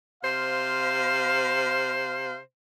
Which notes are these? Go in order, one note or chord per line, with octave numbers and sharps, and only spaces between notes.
C3 C5 F5